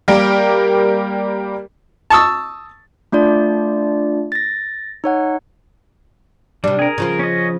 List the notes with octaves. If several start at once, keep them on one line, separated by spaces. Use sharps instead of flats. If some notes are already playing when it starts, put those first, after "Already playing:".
G3 A#3 G4 A#4
A5 C#6 D#6 E6
A3 D4 F4 D5
A6 A#6
D#4 C#5 F#5
C3 G3 D4
G#4 A#4
C#3 F3 F4
C#4 D#5